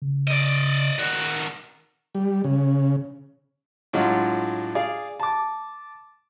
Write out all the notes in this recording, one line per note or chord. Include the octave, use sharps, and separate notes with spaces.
C#3
D5 D#5
D#3 F#4
G3
C#3
A2 F#3 G#3 D4 F4 F#4
G#4 D5 F5
A5 D6